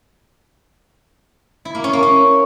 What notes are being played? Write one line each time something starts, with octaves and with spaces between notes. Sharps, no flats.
E4
A#3
C#4
A#3
C#4